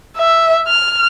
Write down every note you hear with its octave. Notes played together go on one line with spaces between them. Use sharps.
E5
F6